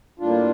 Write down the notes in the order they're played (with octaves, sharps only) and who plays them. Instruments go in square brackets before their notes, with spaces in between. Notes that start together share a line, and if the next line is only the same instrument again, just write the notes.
[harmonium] A2 G3 A#3 D4 F4